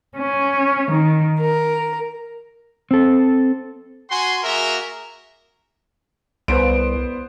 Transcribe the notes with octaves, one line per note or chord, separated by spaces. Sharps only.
C#4
D#3
A#4
C4 A4
F#4 F#5 G#5 C6
A#3 F#4 G#4 A#4 E5 A#5
C2 B3 C5 D7